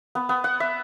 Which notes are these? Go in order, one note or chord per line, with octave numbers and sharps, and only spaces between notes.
B3
B3
F#5
E5